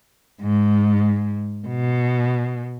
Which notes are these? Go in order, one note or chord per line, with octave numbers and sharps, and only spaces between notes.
G#2
B2